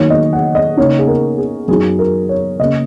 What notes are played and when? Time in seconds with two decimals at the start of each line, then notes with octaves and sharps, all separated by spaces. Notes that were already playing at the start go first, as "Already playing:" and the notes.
Already playing: D#3 F#3 A#3 D#4 C#5
0.10 D#5
0.33 F#5
0.55 D#5
0.77 C#3 A#3 D#4 C#5
0.99 G#4
1.08 A#4
1.38 G#4
1.68 F#2 F#3 D#4 G#4
1.99 A#4
2.29 C#5
2.59 C#3 A#3 C#4 D#5